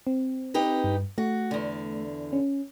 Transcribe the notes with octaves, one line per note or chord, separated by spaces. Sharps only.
C4
D#4 G4 B4
G2
A3 F#4
E2 D3
C#4